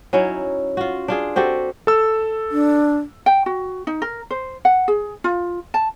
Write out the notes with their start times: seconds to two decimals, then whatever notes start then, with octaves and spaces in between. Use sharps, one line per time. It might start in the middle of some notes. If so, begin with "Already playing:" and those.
0.13 F#3 C#4 D#4 E4
0.77 F4 F#4
1.08 D4 F4 G#4
1.36 C4 F#4 G4 A4
1.87 A4 E6
2.51 D4
3.26 G5
3.46 F#4
3.87 D#4
4.02 A#4
4.31 C5
4.65 F#5
4.88 G#4
5.24 F4
5.74 A5